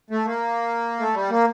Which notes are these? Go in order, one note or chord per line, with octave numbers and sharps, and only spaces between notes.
A3
A#3
A3
G3
A#3